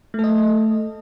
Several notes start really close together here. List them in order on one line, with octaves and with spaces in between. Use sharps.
A3 A4 D#5